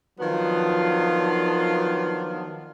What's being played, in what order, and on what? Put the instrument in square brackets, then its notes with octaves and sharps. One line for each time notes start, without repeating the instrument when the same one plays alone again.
[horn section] D#3 F3 F#3 B3 D4 F4